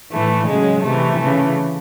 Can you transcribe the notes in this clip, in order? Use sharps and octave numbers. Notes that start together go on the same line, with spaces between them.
A2 E3 A3
C#3 F#3 G#3
C3 E3 A3
C#3 E3